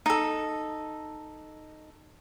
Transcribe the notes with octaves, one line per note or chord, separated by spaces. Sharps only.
D#4 A4